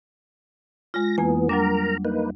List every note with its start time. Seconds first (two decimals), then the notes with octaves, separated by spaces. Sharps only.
0.94 G#3 F4 A#6
1.18 F2 E3 A#3 B3 G#5
1.49 F#3 G3 D4 A#4 A#5
2.05 A#3 D#4 B4